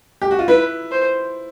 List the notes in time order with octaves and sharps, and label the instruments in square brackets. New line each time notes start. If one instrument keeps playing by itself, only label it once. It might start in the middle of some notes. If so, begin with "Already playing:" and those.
[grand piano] G4
F#4
F4
[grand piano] E4 [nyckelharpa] B4
[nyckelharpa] C5